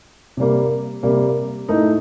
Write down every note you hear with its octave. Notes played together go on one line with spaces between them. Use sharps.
C3 G3 A#3
C3 G3 A#3
A2 A3 D#4